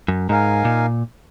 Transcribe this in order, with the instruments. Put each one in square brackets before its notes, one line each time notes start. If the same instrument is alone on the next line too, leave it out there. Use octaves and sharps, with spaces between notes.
[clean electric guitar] F#2
[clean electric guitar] G#2 [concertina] D#4 A#4 F5 G#5
[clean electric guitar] A#2